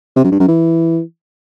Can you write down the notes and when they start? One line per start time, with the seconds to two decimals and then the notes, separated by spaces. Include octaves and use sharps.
0.16 C3
0.24 F#2
0.32 G2
0.40 F#2
0.48 E3